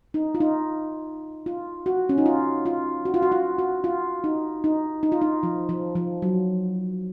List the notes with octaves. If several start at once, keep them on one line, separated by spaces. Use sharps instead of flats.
D#4
F4
D#4
F4
F#4
C#4
D#4
F4
F4
F#4
F4
F#4
F4
F#4
F4
D#4
D#4
D#4
F4
D#4
F3
F3
F3
F#3